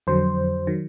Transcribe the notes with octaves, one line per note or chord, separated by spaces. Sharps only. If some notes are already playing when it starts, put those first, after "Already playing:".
F2 D3 F#3 C5
D#3 F#3